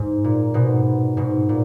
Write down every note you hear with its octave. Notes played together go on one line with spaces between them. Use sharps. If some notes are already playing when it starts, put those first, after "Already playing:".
Already playing: G#2
A#2
G#2 B2
G#2 B2
A#2